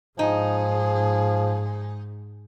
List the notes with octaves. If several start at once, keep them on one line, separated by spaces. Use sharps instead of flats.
G#2 F3 D#4 G#4